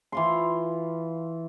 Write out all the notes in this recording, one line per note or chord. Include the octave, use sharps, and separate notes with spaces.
E3 F4 C6